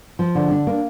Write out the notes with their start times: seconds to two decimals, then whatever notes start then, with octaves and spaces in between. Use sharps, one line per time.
0.19 F3
0.35 D3
0.51 D4
0.67 A#3